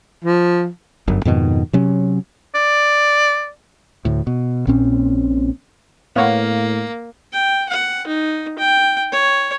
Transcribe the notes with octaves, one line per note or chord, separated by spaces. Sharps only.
F3
G1 F#2
F2 G#2 B2 D#3
C3 F#3 C#4
D5
D2 A2
B2
A#1 A#2 C4 C#4
A2 A#3 B3 C#5 F5 F#5
G5
F#5
D#4
G5
C#5